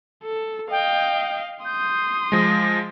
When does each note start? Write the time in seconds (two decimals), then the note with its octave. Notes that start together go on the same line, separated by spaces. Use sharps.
0.24 A4
0.71 D#5 F5 G5
1.65 C6 D#6 G6
2.32 F3 G#3 A#6